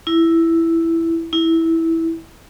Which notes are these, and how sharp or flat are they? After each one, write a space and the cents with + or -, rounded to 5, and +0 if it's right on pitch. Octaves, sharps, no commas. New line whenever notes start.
E4 +5
E4 -10